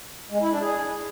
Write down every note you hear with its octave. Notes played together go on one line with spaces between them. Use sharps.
G#3
E4
D4
G#4